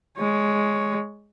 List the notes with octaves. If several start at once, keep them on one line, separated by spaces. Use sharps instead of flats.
G#3 C#5